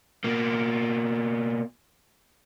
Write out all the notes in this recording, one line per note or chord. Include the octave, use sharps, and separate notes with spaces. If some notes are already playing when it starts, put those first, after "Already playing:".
B2 A#3